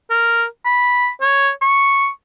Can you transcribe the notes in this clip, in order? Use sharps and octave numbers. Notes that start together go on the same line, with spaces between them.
A#4
B5
C#5
C#6